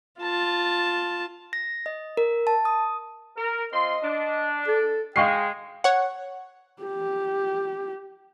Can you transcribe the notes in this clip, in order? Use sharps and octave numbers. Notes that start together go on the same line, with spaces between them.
F4 A5
A#6
D#5
A#4
A5
D#6
A#4
C4 F4 D#5 C6
D4
A4
G#3 F5 G5 C#6 C7
C#5 F#5
G4